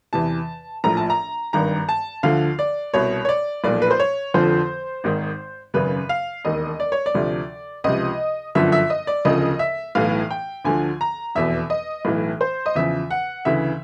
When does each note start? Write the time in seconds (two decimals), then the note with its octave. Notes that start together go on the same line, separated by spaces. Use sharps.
0.13 E2 C3 E3 A5
0.84 A#1 A2 F3 A#5
0.97 A5
1.10 A#5
1.53 G#1 G2 D#3 A#5
1.89 A5
2.23 D2 D3 F3 F5
2.59 D5
2.94 C2 B2 C#5
3.25 C#5
3.29 D5
3.64 B1 A#2 F3 D5
3.82 B4
3.91 C5
4.00 C#5
4.34 F1 F2 D3 F3 C5
5.04 G#1 G#2 D#3
5.74 G#1 F#2 C#3 B4
6.09 F5
6.45 E1 D#2 D#3 D#5
6.80 D5
6.92 C#5
7.06 D5
7.14 D2 C3 F3
7.84 C#2 C3 F3 D#5
8.55 G1 F#2 D3 F3 E5
8.72 E5
8.90 D#5
9.07 D5
9.25 E1 D2 C#3 F3 D#5
9.59 E5
9.95 B1 A2 E3 F5
10.31 G5
10.65 D2 D3 F3 G#5
11.01 A#5
11.35 F1 E2 B2 E5
11.70 D#5
12.05 B1 A2 E3
12.41 C5
12.66 D#5
12.75 E2 C#3 F3 E5
13.10 F#5
13.45 D2 C#3 E3 E5